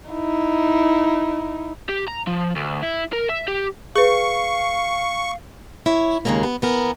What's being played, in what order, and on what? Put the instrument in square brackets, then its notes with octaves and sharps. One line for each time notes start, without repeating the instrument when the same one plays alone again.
[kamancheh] D#4 E4
[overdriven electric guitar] G4
A#5
F3
D2
E4
A#4
E5
G4
[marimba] G#4 B4 [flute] F5 [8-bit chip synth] C#6
[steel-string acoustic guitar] E4 C#5
D#2 A2 C#3 G#3 A#3
B3
E3 B3 A#4